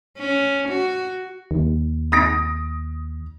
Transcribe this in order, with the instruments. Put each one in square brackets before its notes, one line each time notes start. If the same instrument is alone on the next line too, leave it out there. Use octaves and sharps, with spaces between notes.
[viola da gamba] C#4
F#4
[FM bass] D#2
[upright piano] D#6 A#6 D7